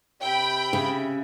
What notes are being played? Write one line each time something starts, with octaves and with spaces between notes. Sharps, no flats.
C3 E5 G5 B5
C#3